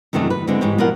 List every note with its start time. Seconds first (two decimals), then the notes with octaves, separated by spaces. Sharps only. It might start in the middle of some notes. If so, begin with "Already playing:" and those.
0.13 F#2 C3 D#3 E3 A3 D4
0.30 B4
0.47 D3 G#3 C4
0.61 G#2 E3 G#3 G4 C#5 G5
0.78 B2 F3 F4 A#4 F5 F#5